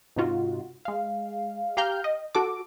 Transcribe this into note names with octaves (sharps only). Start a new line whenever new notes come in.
G#2 C3 D#4 F4 F#4
G#3 F5
G4 F5 G5 A#5 F6 G6
D#5
F#4 A4 D6